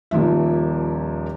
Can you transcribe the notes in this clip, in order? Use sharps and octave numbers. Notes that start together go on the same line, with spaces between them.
D#1 D#2 F3 E5